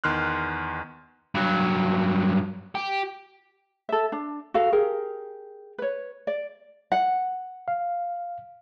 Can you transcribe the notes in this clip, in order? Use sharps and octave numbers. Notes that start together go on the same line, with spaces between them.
E2 D#3 C6 F6 F#6
G2 F#3
G4
A4 E5
D4
F#4 A4 F5
G4 G#4 A#4
B4 C#5
D5
F#5
F5